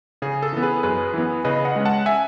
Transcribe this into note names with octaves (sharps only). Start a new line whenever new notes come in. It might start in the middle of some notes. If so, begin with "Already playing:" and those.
C#3 G#4
A4
E3 B3
G#4 B4
F#2 G#4 B4
E3 B3
C#3 B4 D#5
D#5 F#5
G#3 C#4
F#5 A5
E5 G#5